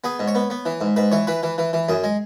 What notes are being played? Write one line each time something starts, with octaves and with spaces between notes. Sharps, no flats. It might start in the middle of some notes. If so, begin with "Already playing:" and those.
B3 G#4
G#2
C#5
B3
B3
E3
G#2
G#2 B4
E3 C#5
E3 B4
E3
E3
E3
F#2 G#4
G#3